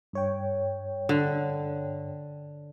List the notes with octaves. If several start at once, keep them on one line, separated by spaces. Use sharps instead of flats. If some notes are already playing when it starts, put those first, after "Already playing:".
G2 C#5 G5
D3